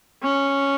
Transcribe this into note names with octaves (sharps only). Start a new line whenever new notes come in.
C#4